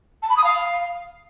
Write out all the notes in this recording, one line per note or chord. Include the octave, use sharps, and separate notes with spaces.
A5
B5
D#6
F5